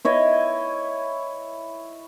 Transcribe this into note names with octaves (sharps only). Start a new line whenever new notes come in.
E4 C#5 D#5